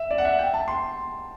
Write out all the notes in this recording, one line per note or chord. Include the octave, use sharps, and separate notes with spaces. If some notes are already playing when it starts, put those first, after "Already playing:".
Already playing: E5
D5
F#5
E5
G5
A5
C6